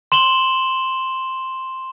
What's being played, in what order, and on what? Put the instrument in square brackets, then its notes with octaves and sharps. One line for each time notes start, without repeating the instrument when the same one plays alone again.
[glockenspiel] C6 E7 F#7 G7